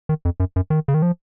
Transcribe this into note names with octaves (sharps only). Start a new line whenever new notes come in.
D#3
F2
F#2
F#2
D#3
C#3
D#3
F3